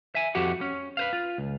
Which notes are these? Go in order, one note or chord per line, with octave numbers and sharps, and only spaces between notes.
E5 G#5
F2 E4 F#4 G4 F#5
C#4
B4 C5 F5
F4
C#2